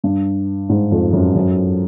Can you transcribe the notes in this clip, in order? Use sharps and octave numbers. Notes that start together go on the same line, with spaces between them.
G2
G#2
F2
F#2
F#2